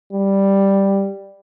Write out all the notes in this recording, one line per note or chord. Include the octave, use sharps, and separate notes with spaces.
G3